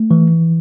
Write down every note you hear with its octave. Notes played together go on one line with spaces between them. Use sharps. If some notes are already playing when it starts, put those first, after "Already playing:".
Already playing: A3
E3